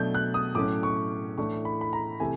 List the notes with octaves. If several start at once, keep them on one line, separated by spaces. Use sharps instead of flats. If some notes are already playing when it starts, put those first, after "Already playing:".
Already playing: B2 F#3 A3 D4 G6
F#6
D#6
A2 F#3 A3 C#4 D6
C#6
A2 E3 A3 D4 C#6
B5
B5
A#5
C3 E3 A3 G#5